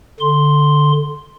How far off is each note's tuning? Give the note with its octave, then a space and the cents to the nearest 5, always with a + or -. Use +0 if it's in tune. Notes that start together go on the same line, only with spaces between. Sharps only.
D3 +0 C6 +0